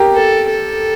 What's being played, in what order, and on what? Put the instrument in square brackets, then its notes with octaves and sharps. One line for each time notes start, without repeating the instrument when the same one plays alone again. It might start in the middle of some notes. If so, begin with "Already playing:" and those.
Already playing: [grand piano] G4 A#4
[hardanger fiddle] A4
A4